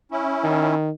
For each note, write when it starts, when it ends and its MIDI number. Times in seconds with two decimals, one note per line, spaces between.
0.11 0.75 61
0.11 0.75 64
0.44 0.90 51